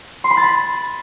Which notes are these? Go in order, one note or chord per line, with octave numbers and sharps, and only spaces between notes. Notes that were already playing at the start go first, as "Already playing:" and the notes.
C6
B5
A6
B5